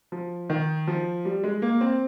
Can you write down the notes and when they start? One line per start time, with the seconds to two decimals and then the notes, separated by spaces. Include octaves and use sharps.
0.12 F3
0.50 D#3
0.87 F3
1.25 G3
1.44 G#3
1.62 A#3
1.81 C4